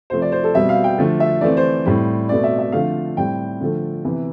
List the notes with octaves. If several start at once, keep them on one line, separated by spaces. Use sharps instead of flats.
C3 F3 A3 C4 C5
D5
C5
A4
B2 G3 C4 E5
F5
G5
D3 F3 A3
E5
E3 A3 C4 D5
C5
A2 G3 C4
B2 A3 C4 D5
E5
E5
D3 F3 A3 C4 F5
A2 G3 C4 G5
D3 F3 A3
C3 E3 B3